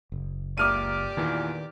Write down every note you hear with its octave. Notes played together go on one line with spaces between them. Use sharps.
F#1
C#2 A#3 G4 D5 D6 F6 D#7
E2 A#2 D#3 E3